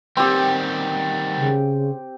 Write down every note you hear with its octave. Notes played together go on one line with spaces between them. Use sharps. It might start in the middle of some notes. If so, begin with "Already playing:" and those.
D#3 G3 C4 G4
C#3